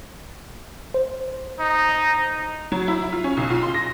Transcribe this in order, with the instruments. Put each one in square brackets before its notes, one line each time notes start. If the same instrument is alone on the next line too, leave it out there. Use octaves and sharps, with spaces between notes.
[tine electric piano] C5
[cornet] D#4
[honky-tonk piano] F#3
E4
F4
C#4
B1
F4
C6
A#6